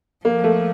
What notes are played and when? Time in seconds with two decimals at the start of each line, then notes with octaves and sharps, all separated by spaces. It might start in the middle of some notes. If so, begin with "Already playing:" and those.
0.25 F3 A#3
0.44 A3